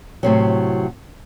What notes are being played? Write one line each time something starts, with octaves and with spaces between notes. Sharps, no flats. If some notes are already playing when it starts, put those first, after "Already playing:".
A2 C3 F#3